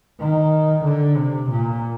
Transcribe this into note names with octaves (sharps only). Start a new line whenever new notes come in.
D#3
D3
C3
A#2